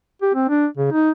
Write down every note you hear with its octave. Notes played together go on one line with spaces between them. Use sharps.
G4
C4
D4
C#3
D#4